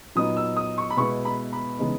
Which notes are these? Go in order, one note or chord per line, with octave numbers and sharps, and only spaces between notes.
A#2 F#3 B3 D#4 D#6
E6
D#6
C#6
B5
B2 G#3 B3 E4 C#6
B5
B5
C#3 E3 G#3 B3 D#4